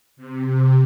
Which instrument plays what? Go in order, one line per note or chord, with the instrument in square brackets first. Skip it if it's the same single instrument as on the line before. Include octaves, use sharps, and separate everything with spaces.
[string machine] C3
C3